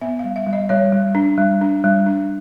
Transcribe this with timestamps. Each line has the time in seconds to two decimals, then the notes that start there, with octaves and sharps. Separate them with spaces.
0.01 B3 E5
0.19 F5
0.24 G3
0.36 E5
0.47 G3
0.53 D#5
0.69 G3 C#5
0.92 G3
1.15 D4
1.37 G3
1.61 D4
1.84 G3
2.06 D4